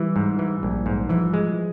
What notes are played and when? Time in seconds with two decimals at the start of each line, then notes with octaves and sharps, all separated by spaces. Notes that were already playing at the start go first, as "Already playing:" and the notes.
Already playing: E3 G3
0.16 G#2
0.39 E3
0.63 A#1
0.86 G#2
1.09 E3 F3
1.34 G#3